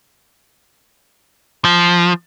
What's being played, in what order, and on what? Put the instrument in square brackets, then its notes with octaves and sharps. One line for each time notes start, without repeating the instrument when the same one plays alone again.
[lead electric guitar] F3